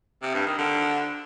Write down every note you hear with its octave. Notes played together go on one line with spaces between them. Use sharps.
C3
G2
D#3
D3